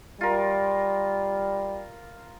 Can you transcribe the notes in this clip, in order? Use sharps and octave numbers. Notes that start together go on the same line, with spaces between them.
G3 F4 A#4